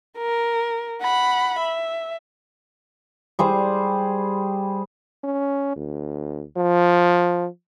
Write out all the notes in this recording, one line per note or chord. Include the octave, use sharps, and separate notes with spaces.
A#4
F#5 B5
E5
G3 G#4 C5
C#4
D2
F3